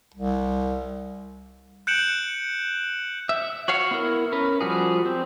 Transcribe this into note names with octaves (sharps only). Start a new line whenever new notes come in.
C2
F#6 G6 C#7 D7 E7 F#7
E5
F#4 C#5 F5 F#5
B3 E4 A#4
C#4 A#4 B4
F3 G3 F#4 G#4
C4